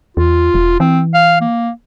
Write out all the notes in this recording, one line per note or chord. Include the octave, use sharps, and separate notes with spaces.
E2 F4
E1
E3 C4
F5
A#3